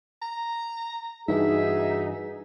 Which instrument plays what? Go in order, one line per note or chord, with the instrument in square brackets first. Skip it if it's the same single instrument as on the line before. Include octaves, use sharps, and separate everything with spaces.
[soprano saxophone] A#5
[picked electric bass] G2 E3 [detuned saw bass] D#4 [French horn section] F#4 G#4 [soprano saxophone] E5